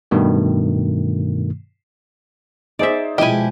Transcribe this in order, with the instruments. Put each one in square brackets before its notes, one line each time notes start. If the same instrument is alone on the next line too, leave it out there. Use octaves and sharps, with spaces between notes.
[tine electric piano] G2 B2 D#3 A3
[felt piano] D#4 G#4 C5 [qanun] D5 E5
[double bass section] B2 G#3 [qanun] F3 G#5 [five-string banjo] E4 G4 [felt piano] D#5